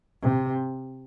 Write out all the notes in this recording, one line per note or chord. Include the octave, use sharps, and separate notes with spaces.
C3